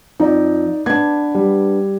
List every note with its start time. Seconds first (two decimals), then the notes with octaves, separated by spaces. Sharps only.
0.20 F2 D#4 D5
0.86 B3 D4 G#6
1.35 G3